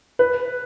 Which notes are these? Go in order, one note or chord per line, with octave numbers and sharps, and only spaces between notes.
B4